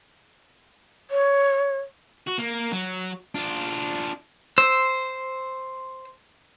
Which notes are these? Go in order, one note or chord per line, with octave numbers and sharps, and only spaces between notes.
C#5
F#4
A#3
F#3
D4 F4
C5 E6